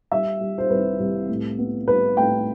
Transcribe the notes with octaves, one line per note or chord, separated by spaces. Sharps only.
G3 E5
G3
C5
C2 B4
C2
A2
B3
G3 B4
A2 G5